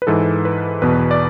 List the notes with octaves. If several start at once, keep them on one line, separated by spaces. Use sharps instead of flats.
B4
G#2 E3 A4
B4
E2 B2 B4
D5